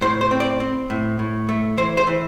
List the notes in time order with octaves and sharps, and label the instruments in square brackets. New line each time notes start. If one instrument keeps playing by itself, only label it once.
[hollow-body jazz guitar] A2 C5
C5
C4
D5
C4
A2
A2
A3
E3 C5
C5
E3